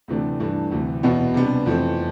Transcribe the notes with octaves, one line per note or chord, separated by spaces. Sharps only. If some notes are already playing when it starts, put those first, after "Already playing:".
D2 C3 E3 A3 D4
G2 E3 A3 D4
D2 C3 E3
E2 B2 B3 E4
C3 G3 B3 D4
F2 E3 A3 C4